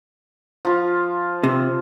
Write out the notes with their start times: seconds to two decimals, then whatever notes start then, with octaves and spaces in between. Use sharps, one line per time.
0.65 F3 F4
1.43 C3